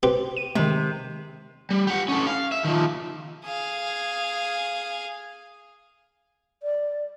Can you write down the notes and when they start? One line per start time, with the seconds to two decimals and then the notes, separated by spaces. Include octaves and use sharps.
0.03 C4 G4 B4
0.37 D#7
0.55 C3 D#3 G#3
1.71 G3
1.87 G4 F#5
2.08 C#4 A4
2.27 F5
2.52 E5
2.64 D#3 F3
3.44 G#4 F5
6.62 D5